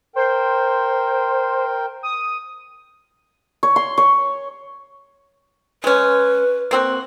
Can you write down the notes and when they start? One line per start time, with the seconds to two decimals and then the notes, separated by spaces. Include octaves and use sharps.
0.16 A#4 C5 G5
2.03 D#6
3.63 C#5
3.76 C6
3.98 C#5
5.84 G#3 C#4 B4
6.71 A#3 C4 F#4